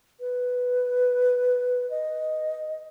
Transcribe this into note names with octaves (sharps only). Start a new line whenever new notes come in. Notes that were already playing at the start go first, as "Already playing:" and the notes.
B4
D#5